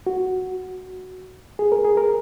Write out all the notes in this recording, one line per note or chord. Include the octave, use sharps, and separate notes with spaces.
F#4
G#4
A#4
G#4
A#4